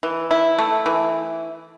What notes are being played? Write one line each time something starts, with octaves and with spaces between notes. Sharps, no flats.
E3
E4
A3
E3